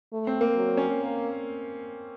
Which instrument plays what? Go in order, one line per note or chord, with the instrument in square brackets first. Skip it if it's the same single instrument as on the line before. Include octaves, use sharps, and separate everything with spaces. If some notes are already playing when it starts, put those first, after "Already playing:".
[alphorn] A3
[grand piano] C4
A#3
[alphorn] F#3
[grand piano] C#4
[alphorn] A#3